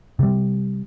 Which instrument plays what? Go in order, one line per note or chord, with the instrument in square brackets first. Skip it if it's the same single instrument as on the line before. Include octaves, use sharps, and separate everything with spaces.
[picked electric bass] C3 G3